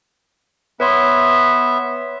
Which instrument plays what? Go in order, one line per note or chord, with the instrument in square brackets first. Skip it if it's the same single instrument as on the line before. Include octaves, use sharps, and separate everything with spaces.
[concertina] B3 E5 [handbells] B4 C#5 C6